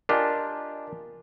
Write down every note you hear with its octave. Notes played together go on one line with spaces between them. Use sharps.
D4 F4 G4 A#4 D#5 G#5